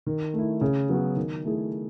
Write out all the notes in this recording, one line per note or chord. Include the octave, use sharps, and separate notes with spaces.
D#3
A3
E4
C#3
F#3 B3 F#4
D#3
A3 E4 G#4